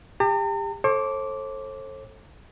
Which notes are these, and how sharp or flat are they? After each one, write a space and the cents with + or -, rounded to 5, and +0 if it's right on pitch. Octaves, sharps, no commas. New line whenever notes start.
G4 +30 A#5 -45
A4 +0 C5 +45 D6 -15